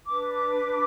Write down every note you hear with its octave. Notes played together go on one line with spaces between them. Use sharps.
D4 B4 D6
D6